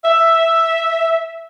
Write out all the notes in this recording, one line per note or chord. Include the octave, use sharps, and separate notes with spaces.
E5